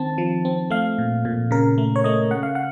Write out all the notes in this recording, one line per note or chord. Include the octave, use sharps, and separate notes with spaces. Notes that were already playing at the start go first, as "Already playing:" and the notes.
Already playing: D#3 C4 A5
F3
C4
A3 F5
A#2
A#2
C#3 A#4
A3
C#5
A3 D#5
C#3 F#5
F5
F#5